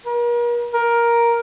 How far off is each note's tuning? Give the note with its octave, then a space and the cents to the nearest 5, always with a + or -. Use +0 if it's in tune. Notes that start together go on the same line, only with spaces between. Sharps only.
A#4 +40
A#4 +10